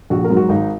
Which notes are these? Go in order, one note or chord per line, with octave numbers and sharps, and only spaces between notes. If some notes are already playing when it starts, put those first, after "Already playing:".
A#1 F#4
A#4
G#2 F#3
F#4
G#1 D#4